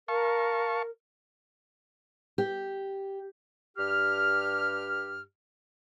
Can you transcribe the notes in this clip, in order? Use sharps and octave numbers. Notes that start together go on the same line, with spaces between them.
A#4 F5 A5 C#6
G4
G2 G4 F6